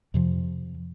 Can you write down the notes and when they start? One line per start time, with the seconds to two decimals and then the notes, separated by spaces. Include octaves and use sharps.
0.14 F2 C3 F3